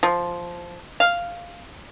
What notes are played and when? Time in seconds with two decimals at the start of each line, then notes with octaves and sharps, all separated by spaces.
0.03 F3
1.00 F5